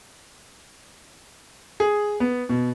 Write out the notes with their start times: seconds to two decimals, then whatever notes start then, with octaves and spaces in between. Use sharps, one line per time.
1.80 G#4
2.20 B3
2.49 B2